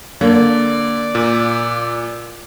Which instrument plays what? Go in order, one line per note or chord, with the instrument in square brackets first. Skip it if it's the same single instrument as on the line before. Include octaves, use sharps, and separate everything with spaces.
[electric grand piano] D3 [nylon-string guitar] A#3 [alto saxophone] D5
[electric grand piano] A#2